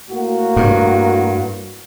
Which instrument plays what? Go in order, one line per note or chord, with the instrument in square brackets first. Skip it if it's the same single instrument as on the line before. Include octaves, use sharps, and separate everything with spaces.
[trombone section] A2 A#3 F#4
[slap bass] G2